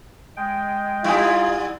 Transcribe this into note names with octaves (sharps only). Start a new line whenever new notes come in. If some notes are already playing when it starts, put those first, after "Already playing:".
G#3 G5
G#2 G3 E4 F4 G#4 C#5